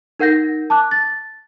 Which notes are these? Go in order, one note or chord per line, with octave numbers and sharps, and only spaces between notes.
D#4 A#4 F#5 G6 A#6
A5 D6 F#6
A6